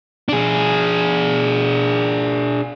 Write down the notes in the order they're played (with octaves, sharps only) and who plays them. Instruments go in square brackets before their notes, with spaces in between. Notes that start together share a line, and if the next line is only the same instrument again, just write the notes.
[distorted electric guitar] D4 G#4